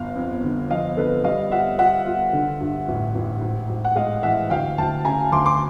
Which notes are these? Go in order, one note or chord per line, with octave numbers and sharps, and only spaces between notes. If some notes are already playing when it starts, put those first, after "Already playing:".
Already playing: G1 F5
F2
D3
F3 D#5 F5
D3 A4 B4
G3 D#5 F5
F4 E5 F#5
F4 E5 F#5
F4
D3
G2
A1
A1
G#2
G#2
F#5
G#3 D#5 F5
E3 E5 F#5
D2 F5 G5
D2 G5 A5
C#3 G#5 A#5
D2 C6 D6
C6 D6